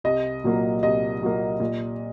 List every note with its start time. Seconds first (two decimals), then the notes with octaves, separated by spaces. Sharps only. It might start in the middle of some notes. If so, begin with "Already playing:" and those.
0.04 C2 D#5
0.44 A#2 F#3 A#3
0.82 C2 D#5
1.22 A#2 F#3 A#3
1.60 A#2